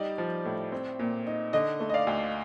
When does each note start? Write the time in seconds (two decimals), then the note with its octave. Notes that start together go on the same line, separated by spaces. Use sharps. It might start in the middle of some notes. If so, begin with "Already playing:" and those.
Already playing: G3 D#4 D5
0.18 F3
0.45 A2
0.72 C4
0.99 A#2
1.27 D#4
1.53 D3 D#5
1.80 A3
1.90 D#5
1.94 D5 F5
2.07 D2